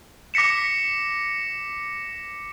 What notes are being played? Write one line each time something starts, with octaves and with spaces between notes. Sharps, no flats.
D6 A#6 B6 C#7 E7